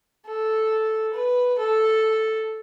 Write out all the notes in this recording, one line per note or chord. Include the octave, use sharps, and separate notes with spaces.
A4
B4
A4